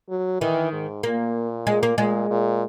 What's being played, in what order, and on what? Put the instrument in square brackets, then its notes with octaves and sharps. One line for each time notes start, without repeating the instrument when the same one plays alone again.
[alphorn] F#3
[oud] D#3 [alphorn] E3
[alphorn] G#2
[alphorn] A#2 [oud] A#3
[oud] G#3
A#3
[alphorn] A#2 [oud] G#3
[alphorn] A#2